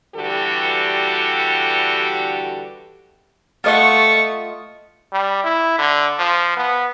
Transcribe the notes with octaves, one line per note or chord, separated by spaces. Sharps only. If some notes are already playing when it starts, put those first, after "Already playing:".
D3 E3 G3 F#4 G4 A4
A3 F4 D#5 F#5 C#6
G3
E4
D3
F3
B3